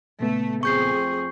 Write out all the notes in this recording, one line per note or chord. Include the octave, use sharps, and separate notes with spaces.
A#2 C#3 A3 B3
F2 A3 C4 G#4 C#6 G6 C7